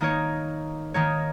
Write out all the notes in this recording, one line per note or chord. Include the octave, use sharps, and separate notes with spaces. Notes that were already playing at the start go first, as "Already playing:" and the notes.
D#3 A#3 D#4 A#4 C#5
D#3 A#3 D#4 A#4 C#5